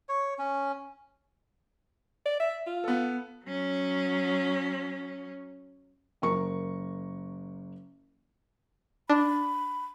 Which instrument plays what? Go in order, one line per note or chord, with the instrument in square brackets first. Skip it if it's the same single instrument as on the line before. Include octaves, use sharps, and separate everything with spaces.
[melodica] C#5
C#4
[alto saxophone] D5
E5
F4
[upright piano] B3 A4
[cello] F#3 C#4
[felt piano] F#1 A#4 C#6
[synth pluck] D4 [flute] B5